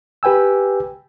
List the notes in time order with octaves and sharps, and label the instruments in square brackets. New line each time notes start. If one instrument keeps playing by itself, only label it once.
[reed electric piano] G4 B4 G5 G#5 E6